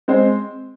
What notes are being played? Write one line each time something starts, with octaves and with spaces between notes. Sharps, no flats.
G#3 C4 C5